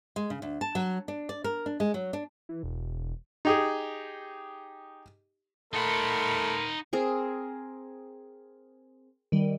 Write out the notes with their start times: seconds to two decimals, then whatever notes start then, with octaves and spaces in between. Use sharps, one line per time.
0.16 G#3
0.30 C#3
0.42 D2
0.61 A5
0.75 F#3
1.08 D4
1.29 D5
1.44 A#4
1.66 D4
1.80 G#3
1.94 F#3
2.13 D4
2.49 E3
2.63 E1
3.45 D#4 G4 G#4
5.73 A3 D#4 A#4 F#5 B5 C6
6.93 C4 G#4 A#4
9.32 D#3 G3